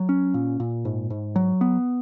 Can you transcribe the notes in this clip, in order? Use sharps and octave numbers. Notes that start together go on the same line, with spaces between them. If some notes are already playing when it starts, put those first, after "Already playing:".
Already playing: F#3
C#4
A#2
A#2
G#2
G#2
F#3
B3